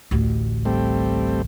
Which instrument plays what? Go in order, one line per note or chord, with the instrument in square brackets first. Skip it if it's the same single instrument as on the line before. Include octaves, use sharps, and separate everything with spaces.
[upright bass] A1 D2
[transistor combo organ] G3 A3 C4